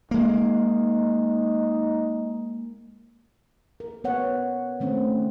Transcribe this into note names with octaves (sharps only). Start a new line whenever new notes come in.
G#3 A#3 D#4
A#4
B3 C#5 F#5
D#3 A3 C4 C#4